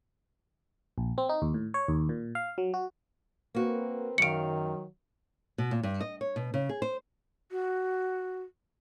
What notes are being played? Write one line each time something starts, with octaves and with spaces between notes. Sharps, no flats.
A#1
C4
D#4
D#2
A2
C#5
D#2
A#2
F5
F#3
F#4
A#3 C4 F#4 A#4 B4
F#2 D#3 F#3 F5 C#7 D7
B2
A#2
G2
D#5
C#5
B2
C#3
G#4
C5
F#4